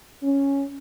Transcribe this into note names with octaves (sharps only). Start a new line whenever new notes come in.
C#4